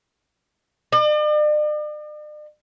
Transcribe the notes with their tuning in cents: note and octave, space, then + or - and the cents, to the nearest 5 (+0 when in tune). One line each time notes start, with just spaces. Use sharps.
D5 +45